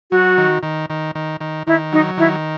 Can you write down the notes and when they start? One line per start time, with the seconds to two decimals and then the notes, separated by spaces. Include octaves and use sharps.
0.11 F#3 F#4
0.38 D#3
0.63 D#3
0.90 D#3
1.15 D#3
1.41 D#3
1.67 D#3 E4
1.92 F#3 D#4
2.17 D#3 E4